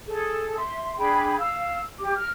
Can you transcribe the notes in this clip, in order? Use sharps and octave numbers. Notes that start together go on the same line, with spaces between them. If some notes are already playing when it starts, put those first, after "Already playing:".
G#4 A4
E5 C6
D4 G#4 G5 B5
F5 E6
G4 D6
F6